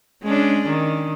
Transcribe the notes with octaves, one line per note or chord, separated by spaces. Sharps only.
G#3 C#4 D4
D#3